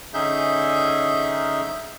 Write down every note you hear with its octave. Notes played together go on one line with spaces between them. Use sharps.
D3 C#4 D#4 G#4 E5 G6